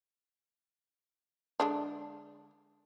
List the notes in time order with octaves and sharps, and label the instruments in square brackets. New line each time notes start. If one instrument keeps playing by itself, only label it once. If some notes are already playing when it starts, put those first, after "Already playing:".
[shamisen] D3 G#3 D4